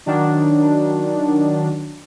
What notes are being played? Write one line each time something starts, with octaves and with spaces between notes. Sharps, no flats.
D#3 F#3 D4